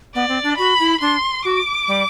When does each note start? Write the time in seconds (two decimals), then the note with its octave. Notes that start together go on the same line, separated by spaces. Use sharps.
0.14 B3 D5
0.28 C4
0.43 D4
0.58 F#4 B5
0.79 E4
1.00 D4 C6
1.45 F#4 D6
1.88 G3